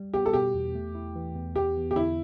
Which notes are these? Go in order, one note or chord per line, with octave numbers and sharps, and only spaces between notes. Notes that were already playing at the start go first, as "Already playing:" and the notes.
Already playing: G3
B3 G4
A4
B2 G4
E2
A3
E4
E3
E2
B3 G4
E2
G4
D3 E4